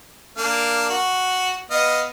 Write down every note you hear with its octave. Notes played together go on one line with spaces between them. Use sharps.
A#3 D4 F5
F#4
B3 D#5 F5